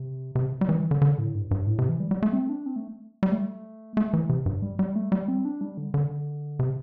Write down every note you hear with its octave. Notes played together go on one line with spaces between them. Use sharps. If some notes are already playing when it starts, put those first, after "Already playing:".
Already playing: C3
C3
G3
E3
D3
D3
A2
G2
G2
A2
C3
E3
G3
G3
A3
C4
D4
C4
A3
G3
A3
A3
E3
C3
G2
G3
G3
A3
G3
C4
D4
G3
D3
D3
C3